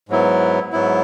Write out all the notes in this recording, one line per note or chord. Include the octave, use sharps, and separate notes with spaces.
G#2 F#3 B3 E4
G#2 F#3 B3 E4